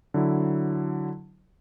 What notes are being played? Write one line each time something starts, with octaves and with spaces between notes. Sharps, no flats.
D3 F#3 E4